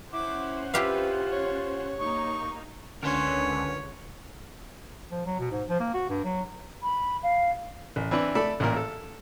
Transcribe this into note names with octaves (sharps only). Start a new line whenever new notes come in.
C#4 E4 C5 F#5 D6
E4 F4 G4 B4 F5
C#5
A#3 D#4 C#6
C#2 D3 C#4 A#4 B4 C#5 C6
F3
F#3
B2
G#2
F3
A#3
F#4
G2
F#3
B5
F5
A1
E3 C4 D4 B4
A3 A4 D5 B5
A1 A#2 A#4
A4